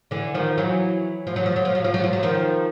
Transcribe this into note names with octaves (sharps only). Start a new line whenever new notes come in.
D3 E3
D#3 F3
E3 F#3
F3
F#3
F3
F#3
F3
F#3
F3
F#3
F3
F#3
D#3 F3